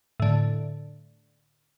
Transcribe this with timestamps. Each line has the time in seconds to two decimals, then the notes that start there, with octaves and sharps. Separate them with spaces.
0.20 A2 D3